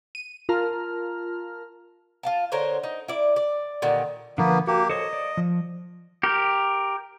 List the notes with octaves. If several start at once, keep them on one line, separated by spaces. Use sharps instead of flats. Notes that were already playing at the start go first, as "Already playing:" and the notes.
D#7
F4 A#4 A5 A#5 F6
F4 F5 A5
D3 A#4 C5 C#5
D#4
E4 D5
D5
A#2 D3 D#3 G3
D3 F3 A#3 B3 B4
A#3 F#4 G4
A4 C5 C#5 D#5
D5
F3
G4 A#4